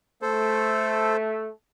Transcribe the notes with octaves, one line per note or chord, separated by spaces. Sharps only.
A3 A4 C5